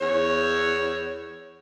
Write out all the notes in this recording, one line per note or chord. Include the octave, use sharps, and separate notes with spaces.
E2 C#5